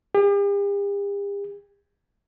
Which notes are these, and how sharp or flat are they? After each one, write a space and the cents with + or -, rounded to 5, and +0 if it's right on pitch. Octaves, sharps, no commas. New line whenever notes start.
G4 +45